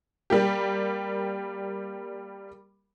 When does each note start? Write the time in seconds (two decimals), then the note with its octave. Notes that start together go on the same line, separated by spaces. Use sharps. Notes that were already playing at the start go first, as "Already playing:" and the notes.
0.30 G3 A#3 G4